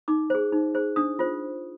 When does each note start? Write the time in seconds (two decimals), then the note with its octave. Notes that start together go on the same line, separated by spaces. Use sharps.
0.08 D#4 D6
0.30 G#4 C5
0.52 D#4
0.75 G#4 C5
0.96 D4 D#6
1.19 F4 C5